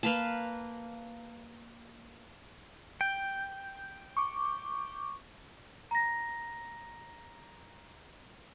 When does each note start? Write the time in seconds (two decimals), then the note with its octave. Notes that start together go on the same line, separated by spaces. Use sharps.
0.03 A#3 B4 F5 A5
3.01 G5 G6
4.17 C#6 D6
5.91 A#5 A#6